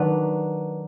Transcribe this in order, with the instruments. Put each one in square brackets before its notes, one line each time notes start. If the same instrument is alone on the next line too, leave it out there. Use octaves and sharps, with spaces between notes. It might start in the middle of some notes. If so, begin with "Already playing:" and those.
Already playing: [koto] D#3 F#3 D4 B4